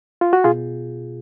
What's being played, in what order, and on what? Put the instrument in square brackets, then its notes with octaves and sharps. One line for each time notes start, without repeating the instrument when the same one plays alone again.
[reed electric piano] F4
F#4
B2 F4 G#4